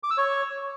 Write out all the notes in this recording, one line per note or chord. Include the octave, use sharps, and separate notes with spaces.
D6
E6
C#5